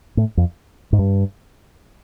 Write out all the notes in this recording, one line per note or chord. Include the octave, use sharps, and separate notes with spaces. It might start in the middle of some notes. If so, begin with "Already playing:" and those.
A2
F2
G#2
G2